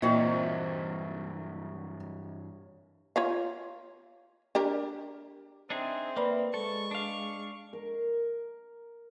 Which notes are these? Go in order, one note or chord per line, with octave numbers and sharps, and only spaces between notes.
G2 A#2 E3 F#3 C4 D#4 C#5 E5
F4 C#5 F5
D4 G4 A#4
C4 D4 D#4 G#4 E5
A#3 B4 D5 B5
G#3 A4 C#6
D4 F5
A#4